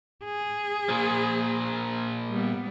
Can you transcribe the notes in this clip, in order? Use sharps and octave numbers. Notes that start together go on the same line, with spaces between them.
G#4
A#2 F3
G3 B3